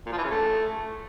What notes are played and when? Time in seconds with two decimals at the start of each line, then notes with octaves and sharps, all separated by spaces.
0.06 A#2
0.12 F3
0.18 E3
0.24 C#3
0.30 A3